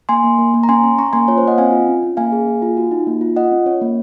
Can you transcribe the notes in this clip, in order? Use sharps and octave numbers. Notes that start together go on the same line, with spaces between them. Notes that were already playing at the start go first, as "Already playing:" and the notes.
A#3 G#5 C6
A#3
A#3
A#3
A#5
C#4 G#5 C6
C#4
C#4 A#5 C#6
A#3 G#5 C6
F4 C#5
C5
A#3 D#5 F#5
C4 F5 G#5
F4
C#4
C#4
A#3 F5 G#5
G#4
A#3
F4
F#4
D#4
A#3
F4
F4 D#5 F#5
C#4
C#4 C#5
A#3